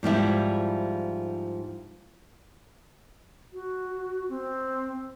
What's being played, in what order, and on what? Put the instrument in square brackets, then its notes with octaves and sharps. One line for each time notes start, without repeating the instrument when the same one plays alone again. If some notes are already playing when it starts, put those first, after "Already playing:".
[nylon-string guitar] G#2 F3 G3 E4
[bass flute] F#4
C4